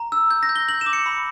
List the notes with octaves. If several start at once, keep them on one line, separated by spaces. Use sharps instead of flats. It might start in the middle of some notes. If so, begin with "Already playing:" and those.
Already playing: A#5
E6
G6
A#6
G6
G7
G6 F#7
E7
D6
C#7
B5